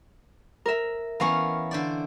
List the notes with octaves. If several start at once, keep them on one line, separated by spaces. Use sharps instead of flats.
A#4 E5
E3 B3 C#4 A#4 F5 C#6
D3 C5 D5